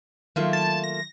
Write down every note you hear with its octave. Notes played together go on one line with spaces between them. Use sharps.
D#3 F#3 A3 A#3 F4
A5
A#6